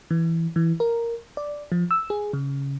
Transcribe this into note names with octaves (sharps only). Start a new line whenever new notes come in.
E3
E3
A#4
D5
F3
E6
G#4
C#3